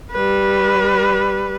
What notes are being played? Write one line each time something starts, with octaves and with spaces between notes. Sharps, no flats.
G3 B4